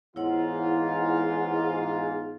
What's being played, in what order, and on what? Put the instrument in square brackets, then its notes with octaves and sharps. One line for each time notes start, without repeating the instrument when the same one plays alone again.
[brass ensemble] E2 G#2 F4 [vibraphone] E4 C#5 F#5